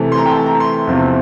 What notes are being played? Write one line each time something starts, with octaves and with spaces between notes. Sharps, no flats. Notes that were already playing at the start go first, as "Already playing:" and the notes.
Already playing: C3 E3 A3
C6
A#5
G5
A5
A#5
C6
E2 C3 F3 C4 F4